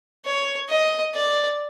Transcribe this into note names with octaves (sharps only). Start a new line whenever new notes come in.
C#5
D#5
D5